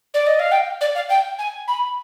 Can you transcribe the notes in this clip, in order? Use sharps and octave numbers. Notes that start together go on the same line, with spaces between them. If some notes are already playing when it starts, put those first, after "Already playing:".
D5
D#5
F5
G5
D5
F5
G5
G#5
B5